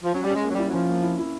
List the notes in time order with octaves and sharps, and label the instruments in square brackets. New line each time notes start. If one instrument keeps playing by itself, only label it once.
[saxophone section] F3
[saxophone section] F#3 [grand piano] C#4
[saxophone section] G3
[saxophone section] G#3 [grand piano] C#4
[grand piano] A#3
[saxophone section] F#3
[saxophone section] G3 [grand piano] E4
[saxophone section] F#3
[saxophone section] F3 [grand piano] C#4
[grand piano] A#3
E4
E4